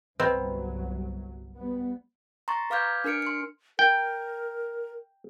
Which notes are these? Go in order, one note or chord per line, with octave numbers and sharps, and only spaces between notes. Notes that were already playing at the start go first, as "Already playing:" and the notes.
G1 C2 F#3 C4 B4 D#5 B5
G3 B3
A#5 C6 C#6 A6
B4 F5 D6 F6 G6 G#6
D4 A#4 F6 C#7 D7
C6 C#7
A#4 G5